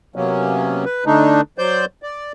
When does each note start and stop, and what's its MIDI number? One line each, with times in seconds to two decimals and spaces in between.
0.16 0.85 48
0.16 0.85 54
0.16 0.85 58
0.16 0.85 59
0.16 0.85 61
0.85 1.05 71
1.06 1.41 50
1.06 1.41 57
1.06 1.41 62
1.06 1.41 63
1.58 1.85 54
1.58 1.85 72
1.58 1.85 74
1.58 1.85 91
2.03 2.32 74